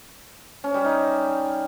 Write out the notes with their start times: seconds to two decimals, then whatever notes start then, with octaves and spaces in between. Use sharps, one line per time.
0.64 C#4
0.74 G3
0.85 D#4